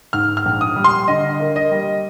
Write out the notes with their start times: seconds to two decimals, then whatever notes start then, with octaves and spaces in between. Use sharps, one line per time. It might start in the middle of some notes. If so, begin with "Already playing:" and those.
0.13 G#2 F6
0.37 F6
0.45 A#1
0.61 D#6
0.76 G3
0.84 C6
1.08 D3 D#5
1.40 A#3
1.56 D#5
1.71 G3